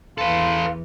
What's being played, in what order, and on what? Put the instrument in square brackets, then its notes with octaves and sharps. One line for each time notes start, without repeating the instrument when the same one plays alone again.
[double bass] E2 E3 [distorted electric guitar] A4 B4 [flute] F5 [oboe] C6